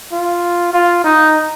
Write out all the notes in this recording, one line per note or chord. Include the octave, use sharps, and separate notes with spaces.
F4
F4
D#4